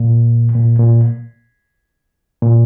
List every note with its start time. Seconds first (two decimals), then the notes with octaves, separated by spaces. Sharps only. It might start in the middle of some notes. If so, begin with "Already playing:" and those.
Already playing: A#2
0.55 A#2
0.79 A#2
2.42 A#2